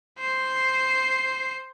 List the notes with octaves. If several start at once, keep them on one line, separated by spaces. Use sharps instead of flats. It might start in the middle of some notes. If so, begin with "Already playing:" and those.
C5 C7